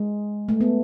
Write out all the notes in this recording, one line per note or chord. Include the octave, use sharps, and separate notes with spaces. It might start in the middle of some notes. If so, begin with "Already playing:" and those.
Already playing: G#3
A3
B3